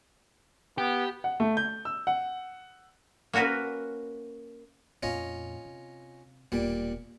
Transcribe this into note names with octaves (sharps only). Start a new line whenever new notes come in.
B3 G4
F#5
A3
G6
E6
F#5
A#3 C#4 F#4 A#4 B4
F2 A#2 C#4 F4 D#5
C3
E1 A#2 G3